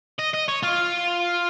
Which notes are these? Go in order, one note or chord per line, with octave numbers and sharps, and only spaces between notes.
D#5
D#5
C#5
F4